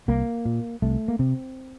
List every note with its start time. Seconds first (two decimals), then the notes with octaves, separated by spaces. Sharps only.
0.08 C2 A#3
0.45 A#2
0.82 C2 A3
1.08 A#3
1.19 C3 C4